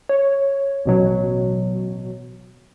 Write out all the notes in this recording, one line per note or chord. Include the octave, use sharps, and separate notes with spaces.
C#5
A1 B2 F#3